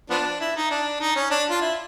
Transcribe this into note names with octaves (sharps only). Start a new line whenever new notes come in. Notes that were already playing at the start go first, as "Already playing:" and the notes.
F3 B3 D4
E4
D#4
D4
D#4
C#4
D4
F4
E4